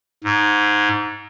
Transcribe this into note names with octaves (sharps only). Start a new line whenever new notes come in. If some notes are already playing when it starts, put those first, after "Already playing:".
G#2